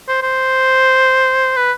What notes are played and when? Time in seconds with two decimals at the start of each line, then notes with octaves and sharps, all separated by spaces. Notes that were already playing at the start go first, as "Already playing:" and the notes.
0.08 C5
0.23 C5
1.57 B4